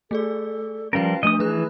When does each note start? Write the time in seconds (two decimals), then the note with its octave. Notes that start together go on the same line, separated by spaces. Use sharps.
0.11 A3 G#4 A4 D5
0.93 F3 G3 C#4 A#4 B4 F5
1.23 F3 A3 D4 D#5 D#6
1.39 E3 F3 G#4 B4 F#6